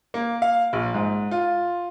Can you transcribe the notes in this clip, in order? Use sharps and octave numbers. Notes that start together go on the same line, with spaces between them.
A#3
F5
A#1
G#2
F4